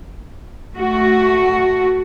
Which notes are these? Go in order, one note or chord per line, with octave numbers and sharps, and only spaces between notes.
A3 F#4